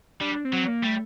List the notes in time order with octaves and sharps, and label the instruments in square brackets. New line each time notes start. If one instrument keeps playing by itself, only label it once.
[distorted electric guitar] G3 [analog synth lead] D4
[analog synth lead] C4
[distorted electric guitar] F#3
[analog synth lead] A#3
[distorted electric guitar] G3 [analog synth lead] A3